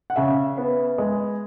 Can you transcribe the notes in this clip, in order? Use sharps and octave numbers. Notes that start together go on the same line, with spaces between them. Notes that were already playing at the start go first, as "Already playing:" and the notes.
F#5
C#3 E5
B3
G#3